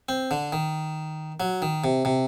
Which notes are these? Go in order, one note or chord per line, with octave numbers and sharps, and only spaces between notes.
C4
D3
D#3
F#3
D#3
C3
C3